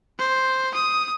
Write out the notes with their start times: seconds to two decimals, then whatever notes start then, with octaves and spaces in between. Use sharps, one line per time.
0.19 C5
0.74 D#6